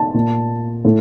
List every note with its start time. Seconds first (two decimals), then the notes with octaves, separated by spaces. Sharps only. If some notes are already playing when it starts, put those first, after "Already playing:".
Already playing: A5
0.14 A#2
0.85 A2